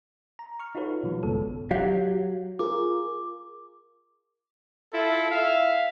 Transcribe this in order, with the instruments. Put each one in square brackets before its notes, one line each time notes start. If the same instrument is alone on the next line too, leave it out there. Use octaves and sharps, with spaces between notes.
[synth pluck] A#5
C#6 F6
D#4 F4 F#4 A4 B4 C#5
B2 D#3 F3 G3
A1 G2 C#3 G#3 B3 A4
[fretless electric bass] F#3 [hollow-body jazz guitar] G4 F5
[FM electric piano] F4 G#4 A#4 [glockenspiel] D6
[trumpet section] E4 F4 A4
E5 F5